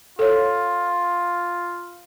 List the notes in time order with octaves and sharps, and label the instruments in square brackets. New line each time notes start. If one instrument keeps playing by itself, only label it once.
[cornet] F4 [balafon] A4 C#5